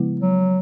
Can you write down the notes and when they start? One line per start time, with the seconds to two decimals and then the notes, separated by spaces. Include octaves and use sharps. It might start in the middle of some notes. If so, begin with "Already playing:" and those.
Already playing: C#3 F3 G#3 B3 E4
0.20 F#3